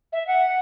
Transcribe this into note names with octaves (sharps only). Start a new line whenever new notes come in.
E5
F#5